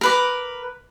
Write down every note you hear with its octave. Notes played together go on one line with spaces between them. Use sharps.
A#4 B4 D6